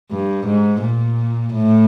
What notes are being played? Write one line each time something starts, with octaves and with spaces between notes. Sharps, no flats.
G2
G#2
A#2
A2